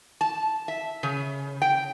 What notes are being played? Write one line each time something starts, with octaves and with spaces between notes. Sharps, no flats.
A5
E5
C#3
G5